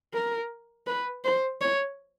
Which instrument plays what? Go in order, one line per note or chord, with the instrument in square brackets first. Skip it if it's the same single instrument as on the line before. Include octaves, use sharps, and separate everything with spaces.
[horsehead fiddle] A#4
B4
C5
C#5